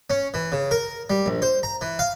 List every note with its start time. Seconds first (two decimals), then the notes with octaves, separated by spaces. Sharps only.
0.10 C#4
0.34 E3
0.52 C#3
0.71 A#4
1.10 G3
1.26 A#1
1.42 C5
1.63 A#5
1.81 E3
1.99 F5